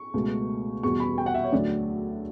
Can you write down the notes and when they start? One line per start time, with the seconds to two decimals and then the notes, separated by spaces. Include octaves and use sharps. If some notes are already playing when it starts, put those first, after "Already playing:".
Already playing: C#6
0.14 C#2 B2 A3
0.83 E2 B2 G3 C#6
1.00 B5
1.18 G5
1.26 F#5
1.34 E5
1.44 C#5
1.52 D2 D3 F#3 D5